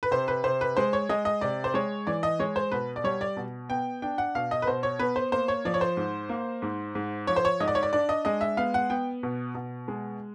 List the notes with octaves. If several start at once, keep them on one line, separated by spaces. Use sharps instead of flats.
B4
C3 C5
B4
C3 C5
B4
G#3 C5
C#5
G#3 D#5
D#5
C3 D5
C5
G#3 C#5
E3 D5
D#5
G#3 C#5
C5
B2 B4
D5
G3 C#5
D5
B2
B3 G5
D4 G5
F#5
B2 F5
D#5
B4
B2 C5
C#5
B3 B4
C5
A#3 C5
C#5
F3 D5
C#5
C5
G#2
A#3
G#2
G#2
F3 C#5
C5
C#5
G#2 D#5
D5
C#5
D5
D4 D5
D#5
G#3 D#5
E5
B3 F5
F#5
B3 G5
B2
B2
G#3